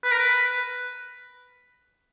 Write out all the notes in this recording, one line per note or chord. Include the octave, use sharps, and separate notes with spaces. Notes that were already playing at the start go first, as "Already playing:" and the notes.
B4
A#4
B4